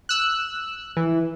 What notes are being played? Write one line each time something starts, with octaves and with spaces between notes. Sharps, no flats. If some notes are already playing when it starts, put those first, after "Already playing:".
E6 F#6
E3